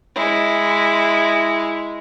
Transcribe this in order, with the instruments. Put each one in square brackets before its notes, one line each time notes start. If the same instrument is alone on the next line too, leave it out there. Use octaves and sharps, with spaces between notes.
[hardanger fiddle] G#3 E4